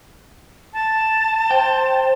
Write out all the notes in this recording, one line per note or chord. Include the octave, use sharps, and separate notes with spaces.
A5
C5 G5